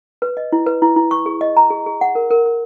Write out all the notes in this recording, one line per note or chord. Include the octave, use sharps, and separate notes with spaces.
B4
D#5
E4
B4
E4
E4
C#6
G#4
D#5
A#5
G#4
G#4
F#5
A#4
A#4
A#4